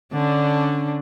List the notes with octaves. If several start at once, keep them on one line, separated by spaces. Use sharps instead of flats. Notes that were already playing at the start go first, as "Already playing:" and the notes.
D3 C#4 D4